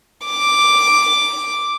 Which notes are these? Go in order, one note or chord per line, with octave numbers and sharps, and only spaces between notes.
D6